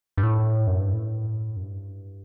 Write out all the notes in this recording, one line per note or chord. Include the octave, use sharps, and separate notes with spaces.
G2
A2
F#2
G2
A2
F#2
G2